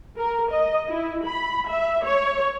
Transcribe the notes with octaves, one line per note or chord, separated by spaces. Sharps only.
A#4
D#5
E4
B5
E5
C#5